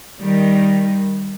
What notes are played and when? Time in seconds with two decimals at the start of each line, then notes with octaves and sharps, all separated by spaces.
0.21 D#3 G3